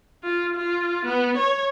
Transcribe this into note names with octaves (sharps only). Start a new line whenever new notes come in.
F4
F4
B3
C#5